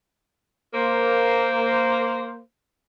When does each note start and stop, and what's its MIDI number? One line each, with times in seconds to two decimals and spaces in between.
0.74 2.39 58
0.74 2.39 72